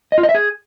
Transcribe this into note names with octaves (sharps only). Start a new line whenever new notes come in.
D#5
F4
D#5
E5
G#4